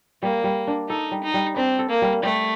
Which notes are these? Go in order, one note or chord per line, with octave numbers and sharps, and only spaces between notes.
G3 A#3
G3
D4
D#4 A4
G3
D#4
G3
C4 D4
A4
A#3
G3
G3 A3